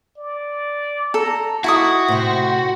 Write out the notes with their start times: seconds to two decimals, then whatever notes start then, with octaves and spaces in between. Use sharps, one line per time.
0.18 D5
1.14 A4 A#5
1.64 D#4 E4 F#4 C#6 D#6
2.08 A2 C3 C5